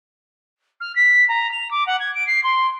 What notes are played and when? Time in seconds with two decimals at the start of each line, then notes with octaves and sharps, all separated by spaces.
0.80 F6
0.95 B6
1.28 A#5
1.52 F7
1.71 D6
1.87 F#5
2.00 G#6
2.15 D7
2.27 C7
2.43 C6